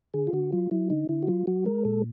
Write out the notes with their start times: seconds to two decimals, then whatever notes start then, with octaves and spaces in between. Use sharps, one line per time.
0.14 D3 G#4
0.27 F4
0.33 D3 F#4
0.52 F#3 F4
0.71 F#3 E4
0.90 D3 D#4
1.09 D3 E4
1.23 F#4
1.27 F#3 F4
1.47 F#3 F#4
1.65 G#3 A#4
1.85 A#2 A4